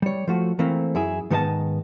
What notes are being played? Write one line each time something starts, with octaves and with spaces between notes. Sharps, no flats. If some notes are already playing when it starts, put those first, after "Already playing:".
G3 C#5
F3 A3 F#4
E3 A3 A#3 C4
F#2 E4 G#4
G#2 D#3 B3 A#4 D#5 A5